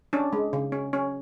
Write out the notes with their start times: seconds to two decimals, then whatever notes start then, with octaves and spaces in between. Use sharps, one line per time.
0.13 C#4 D4
0.33 G#3
0.53 C#3
0.72 C#4
0.93 C#4